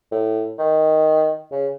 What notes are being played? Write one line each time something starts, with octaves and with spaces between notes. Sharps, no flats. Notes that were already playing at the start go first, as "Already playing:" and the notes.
A2
D#3
C#3